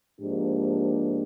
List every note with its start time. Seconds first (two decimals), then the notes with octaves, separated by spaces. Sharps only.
0.20 G#2 F3 A#3 D4 G4